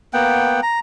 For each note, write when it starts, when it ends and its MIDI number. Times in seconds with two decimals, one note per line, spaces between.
0.13 0.60 58
0.13 0.60 59
0.13 0.60 78
0.13 0.60 79
0.63 0.79 82